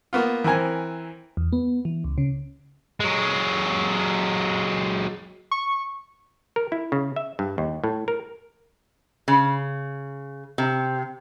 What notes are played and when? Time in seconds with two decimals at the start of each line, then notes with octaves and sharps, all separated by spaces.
0.13 A#3 B3 F4
0.44 E3 C4 A#4 G#5
1.37 E2
1.53 B3
1.85 E3
2.04 C#2
2.18 C#3
3.00 F#3 G#3
5.51 C#6
6.56 A#4
6.72 E4
6.92 C#3
7.16 E5
7.39 G2
7.58 D#2
7.84 A2
8.08 A#4
9.28 C#3
10.58 C3